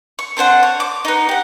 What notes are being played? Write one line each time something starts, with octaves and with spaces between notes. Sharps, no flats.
C#6
C4 D4 C5 F#5
C#5
D6
B3 D#4
G4 F#5